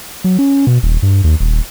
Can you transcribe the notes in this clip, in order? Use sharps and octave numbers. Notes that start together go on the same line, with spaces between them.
F#3
C#4
B2
D#1
G2
D#2
D#1